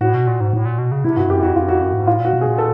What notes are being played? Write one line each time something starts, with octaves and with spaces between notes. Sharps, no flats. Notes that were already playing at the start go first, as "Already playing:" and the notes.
A2 F#4
B2
A#2
G#2
A2
A#2
B2
C#3
C3 E4
G2 F#4
F#2 G4
F2 F#4
F2 F4
F#2
F2 F#4
F#2
G#2
A2 F4
A#2 F#4
B2
A#2 G#4
A4